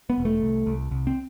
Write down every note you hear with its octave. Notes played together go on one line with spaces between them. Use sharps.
B3
E1
A3
C2
C2
C2
C4